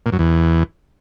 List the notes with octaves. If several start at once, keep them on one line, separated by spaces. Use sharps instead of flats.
A#2
F#2
E2